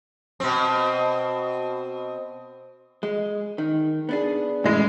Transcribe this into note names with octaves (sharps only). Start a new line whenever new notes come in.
B2 C4
G#3
D#3
B3 D4 G#4
A2 C#3 E3 G#3